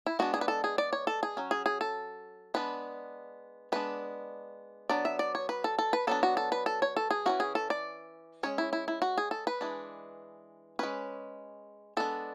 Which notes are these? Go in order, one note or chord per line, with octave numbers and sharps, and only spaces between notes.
E4
G#3 B3 D4 F#4
G#4
B4
A4
G#4
D5
C#5
A4
G#4
F#3 C#4
G#4
G#4
A4
G#3 B3 D4 B4
G#3 B3 D4 B4
F#3 B3 D4 D5
E5
D5
C#5
B4
A4
A4
B4
F#3 B3 D4 A4
F#4
A4
B4
A4
C#5
A4
G#4
E3 A3 C#4 F#4
G#4
A4
D5
G#3 C#4 C#5
E4
E4
E4
F#4
G#4
A4
B4
E3 G#3 D4
G#3 C#4 B4
G#3 B3 D4 A4